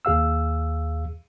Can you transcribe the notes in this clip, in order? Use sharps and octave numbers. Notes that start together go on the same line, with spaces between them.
D#2 G#4 F5 E6